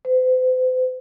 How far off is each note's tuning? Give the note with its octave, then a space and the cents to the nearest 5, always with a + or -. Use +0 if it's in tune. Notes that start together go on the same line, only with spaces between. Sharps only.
C5 -40